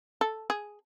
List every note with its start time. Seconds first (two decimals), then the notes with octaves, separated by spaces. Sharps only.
0.21 A4
0.50 G#4